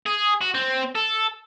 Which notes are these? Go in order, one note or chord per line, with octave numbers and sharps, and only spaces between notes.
G#4
F#4
C4
A4